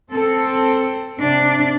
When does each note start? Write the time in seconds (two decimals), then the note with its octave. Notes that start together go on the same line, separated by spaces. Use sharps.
0.11 C4 A4
1.20 C3 D4